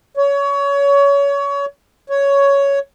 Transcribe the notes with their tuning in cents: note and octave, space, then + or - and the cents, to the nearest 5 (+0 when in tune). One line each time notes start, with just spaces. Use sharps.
C#5 +25
C#5 +10